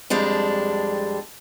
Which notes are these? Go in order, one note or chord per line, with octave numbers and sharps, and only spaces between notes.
F2 G3 G#3 D4